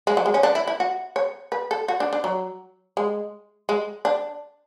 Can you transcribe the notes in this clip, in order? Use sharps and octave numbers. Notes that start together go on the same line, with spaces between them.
G#3
F#3
G#3
C#4
D4
E4
E4
F#4
C#5
B4
A4
F#4
D4
D4
F#3
G#3
G#3
D4